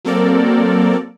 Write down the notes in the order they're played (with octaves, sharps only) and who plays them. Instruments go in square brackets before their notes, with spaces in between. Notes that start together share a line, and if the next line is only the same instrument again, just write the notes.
[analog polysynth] F#3 A#3 C4 A4 A#4 D5